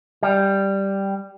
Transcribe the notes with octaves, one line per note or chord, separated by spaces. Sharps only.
G3